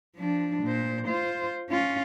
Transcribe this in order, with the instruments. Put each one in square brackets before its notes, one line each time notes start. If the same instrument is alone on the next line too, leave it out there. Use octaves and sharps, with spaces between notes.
[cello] F3 D4
A#2 C5
F4 C5
C#4 F4